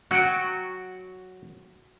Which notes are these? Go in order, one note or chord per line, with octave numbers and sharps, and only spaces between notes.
F#3 F#4 F#5 G5